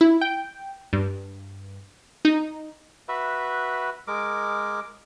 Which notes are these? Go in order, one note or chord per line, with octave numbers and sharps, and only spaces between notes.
E4
G5
G2
D#4
F#4 B4 E5
G#3 A#4 D6